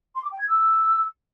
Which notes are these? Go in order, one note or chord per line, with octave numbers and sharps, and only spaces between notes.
C6
D6
G5
G#6
E6